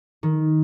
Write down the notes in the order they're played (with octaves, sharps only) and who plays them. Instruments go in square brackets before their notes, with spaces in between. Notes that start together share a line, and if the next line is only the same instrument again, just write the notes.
[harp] D#3